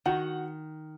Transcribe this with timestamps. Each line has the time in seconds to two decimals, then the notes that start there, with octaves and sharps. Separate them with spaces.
0.06 D#3 F#4 F#5